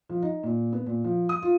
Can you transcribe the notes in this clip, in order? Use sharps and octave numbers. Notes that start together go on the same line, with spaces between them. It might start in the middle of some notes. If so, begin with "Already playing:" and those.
F3
D#4
A#2
B3
A#2
F3
D#6
F4